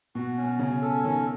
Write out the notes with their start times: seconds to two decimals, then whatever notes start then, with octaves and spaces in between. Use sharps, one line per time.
0.15 B2 F#4
0.37 C#4
0.43 B2
0.59 C#3 C#4
0.82 A4
1.04 D#3 C#4